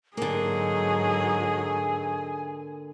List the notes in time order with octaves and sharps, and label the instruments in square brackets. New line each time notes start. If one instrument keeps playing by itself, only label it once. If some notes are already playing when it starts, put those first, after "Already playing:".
[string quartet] G#2 F#3 D#4 [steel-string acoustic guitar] D3 A#3 [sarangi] G#4 [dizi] G#5